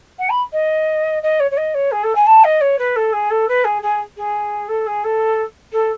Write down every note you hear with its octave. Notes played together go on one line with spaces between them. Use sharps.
F#5
B5
D#5
D#5
C#5
C#5
D#5
C#5
G#4
A4
G#5
A5
D#5
C#5
B4
A4
G#4
A4
B4
G#4
G#4
G#4
A4
G#4
A4
A4